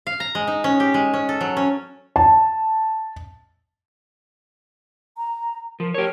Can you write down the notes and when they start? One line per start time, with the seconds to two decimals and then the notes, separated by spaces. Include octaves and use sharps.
0.07 F5
0.20 A#5
0.35 G#3
0.47 D#4
0.64 C#4
0.80 G4
0.94 G#3
1.14 C#4
1.29 A4
1.41 F#3
1.57 C#4
2.16 A5
5.17 A#5
5.80 F3 A#4
5.94 G4 A#4 C#5